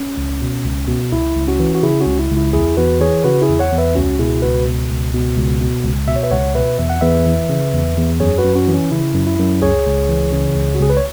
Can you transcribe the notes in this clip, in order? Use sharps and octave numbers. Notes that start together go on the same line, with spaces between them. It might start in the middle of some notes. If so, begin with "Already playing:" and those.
Already playing: C#4
C#2
B2
C#2
B2
C#2 E4
C#2
C#4 F#4
E3
F#4
C#3 E4 G#4
C#4 F#4
C#2
E4
C#2
E4
E2 E4 G#4
E2 F#4 B4
E3 G#4 C#5
C#3 F#4 B4
E4 G#4
E2
C#5 F#5
E2
B4 E5
C#2 C#4 F#4
B2 E4 G#4
C#2 F#4 B4
B2
C#2
B2
C#2
B2
C#2
B2 E5
C#5
B4 E5
C#2 C#5 F#5
B2 B4 E5
E2 E5
F#5
E2 B4 E5
E3
C#3
E2
E2
F#2 G#4 C#5
F#4 B4
F#2
C#4 F#4
E3
C#4
C#3 E4
F#2
E4
F#2
C#2 G#4 C#5
C#2
E3
C#3
C#2
F#4
C#2 G#4
B4
C#5